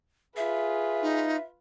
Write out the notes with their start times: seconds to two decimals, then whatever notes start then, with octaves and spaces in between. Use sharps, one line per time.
0.37 F4 G#4 B4 E5
1.02 D#4